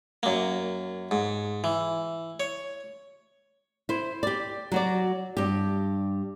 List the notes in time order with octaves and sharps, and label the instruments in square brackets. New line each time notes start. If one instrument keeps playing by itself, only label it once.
[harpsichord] F#2 A#3
G#2
E3
C#5
[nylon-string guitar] E4 C5
G4 D5
F#3 F#4 D5
G2 G4